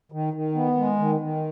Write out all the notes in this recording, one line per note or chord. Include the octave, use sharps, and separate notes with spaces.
D#3
D#3
B3
G#3
D#3
D#3